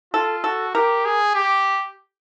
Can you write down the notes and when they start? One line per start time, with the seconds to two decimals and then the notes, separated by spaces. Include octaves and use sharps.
0.13 F4 A4
0.44 F#4 A4
0.74 G4 A#4
1.05 G#4
1.35 G4